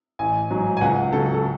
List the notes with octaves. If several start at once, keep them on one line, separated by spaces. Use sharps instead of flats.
A1 G#5
G#2 F#3
G#5
C#2 F#5
C#3 F#3 A4
A4